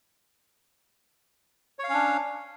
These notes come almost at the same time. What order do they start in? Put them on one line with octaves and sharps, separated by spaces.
C#5 F5 C#4 D4